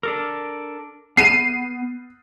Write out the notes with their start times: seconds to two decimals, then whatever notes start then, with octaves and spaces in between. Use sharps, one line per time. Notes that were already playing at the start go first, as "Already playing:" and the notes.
0.03 D4 A4 A#4
1.17 B3 C7 D#7